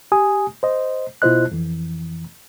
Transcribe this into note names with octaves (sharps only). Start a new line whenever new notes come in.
G4 G#5 D#6
C5 D#5
B2 E4 F4 C5 D#5 F#6
F2 E3